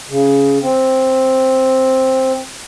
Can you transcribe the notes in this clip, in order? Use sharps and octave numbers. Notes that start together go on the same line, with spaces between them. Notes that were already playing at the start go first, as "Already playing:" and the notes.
C#3
C4